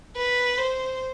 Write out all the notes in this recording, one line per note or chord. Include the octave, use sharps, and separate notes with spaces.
B4
C5